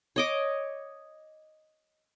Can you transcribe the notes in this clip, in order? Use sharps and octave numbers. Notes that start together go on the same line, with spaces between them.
C#5 D#5 D6